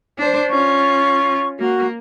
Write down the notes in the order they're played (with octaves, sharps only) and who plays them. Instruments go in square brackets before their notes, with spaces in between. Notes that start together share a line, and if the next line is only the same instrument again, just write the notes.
[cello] D4 C5
[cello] C#4 F4 [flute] C#6
[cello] A#3 [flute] F#4